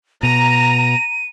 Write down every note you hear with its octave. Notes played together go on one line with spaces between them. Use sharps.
B2 A#5 D#7